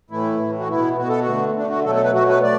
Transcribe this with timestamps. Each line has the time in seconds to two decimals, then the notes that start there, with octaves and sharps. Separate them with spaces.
0.10 A2 E3 A3 E4
0.40 A2 E3 A3
0.59 F#4
0.69 B2 B3 E4
0.98 B2 B3 F#4
1.09 A4
1.20 F#4
1.26 D3 A3
1.56 D3 A3 D4
1.70 F#4
1.84 B2 F#3 A3 A4
1.95 A4
2.04 B4
2.13 B2 F#3 A3 F#4
2.29 B4
2.43 A3 D5